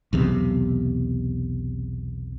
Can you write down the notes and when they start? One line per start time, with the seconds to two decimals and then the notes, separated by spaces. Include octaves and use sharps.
0.13 B1 E2 C3